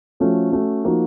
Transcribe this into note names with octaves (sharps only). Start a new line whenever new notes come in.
F3 A3 C#4 F#4 A4
A3 C#4 F#4
F3 A#3 D#4 F#4